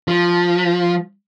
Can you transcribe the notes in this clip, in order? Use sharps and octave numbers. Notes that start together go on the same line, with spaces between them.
F3